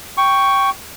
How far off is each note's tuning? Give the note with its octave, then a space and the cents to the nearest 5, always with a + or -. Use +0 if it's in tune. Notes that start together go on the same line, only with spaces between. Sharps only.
G5 +0 C#6 +5